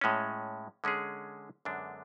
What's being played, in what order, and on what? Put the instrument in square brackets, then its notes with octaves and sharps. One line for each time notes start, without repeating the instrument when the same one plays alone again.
[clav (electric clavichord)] A2 G#3 C#4
D3 G#3 C#4 G#4
F#2 D3 G#3 B3 D4